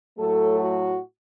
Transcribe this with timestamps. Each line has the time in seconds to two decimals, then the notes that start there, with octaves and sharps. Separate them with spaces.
0.18 A2 F#3 A3 A4
0.56 F#4